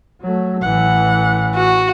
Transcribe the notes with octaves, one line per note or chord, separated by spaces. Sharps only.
F#3 A3
A1 E3 F#5
F#4